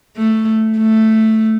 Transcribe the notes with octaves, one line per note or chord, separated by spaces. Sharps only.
A3
A3